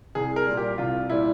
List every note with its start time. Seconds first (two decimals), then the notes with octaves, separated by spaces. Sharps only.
0.15 C2 G#4
0.36 A#4
0.46 A#2 G3
0.57 G4
0.78 C2 F4
1.10 A#2 G3 E4